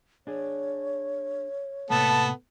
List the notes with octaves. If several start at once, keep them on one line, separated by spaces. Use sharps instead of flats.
D4 G#4 C#5
A2 C3 A#3 B3 A4 A5